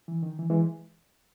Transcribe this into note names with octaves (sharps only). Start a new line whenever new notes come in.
E3
D#3
E3
E3 G#3